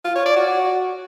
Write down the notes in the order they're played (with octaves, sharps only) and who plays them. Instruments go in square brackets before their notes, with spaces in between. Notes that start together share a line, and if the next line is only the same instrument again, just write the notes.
[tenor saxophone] F4
C#5
D5
F#4